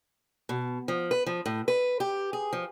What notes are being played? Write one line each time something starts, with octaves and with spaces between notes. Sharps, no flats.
B2
F3
B4
F3
A2
B4
G4
G#4
F3